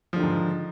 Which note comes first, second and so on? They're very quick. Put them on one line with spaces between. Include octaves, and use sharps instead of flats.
F3 D3 D#3 G#2